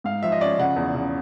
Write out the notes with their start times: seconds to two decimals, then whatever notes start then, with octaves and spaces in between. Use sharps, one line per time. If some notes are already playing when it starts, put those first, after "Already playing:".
0.04 G#2 F5
0.23 F3 E5
0.32 D#5
0.41 C#4 D5
0.59 C#3 F#5
0.76 E2
0.94 C#3